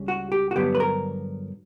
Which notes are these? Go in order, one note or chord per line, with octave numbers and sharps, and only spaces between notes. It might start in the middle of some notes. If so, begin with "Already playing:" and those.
Already playing: C#2 C#3 G3
F#4
G4
F#4
G2 D3 F#3 B3 G4
B4
A#4